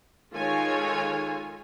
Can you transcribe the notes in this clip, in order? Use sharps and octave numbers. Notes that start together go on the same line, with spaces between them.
D#3 G#3 F4 A4 C#5 G#5